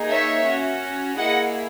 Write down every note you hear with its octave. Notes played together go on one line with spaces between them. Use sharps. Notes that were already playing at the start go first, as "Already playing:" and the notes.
Already playing: A#3 D#4 G#4
C#5 E5
C#4 F#4
A#3 E4 G#4 D#5 F#5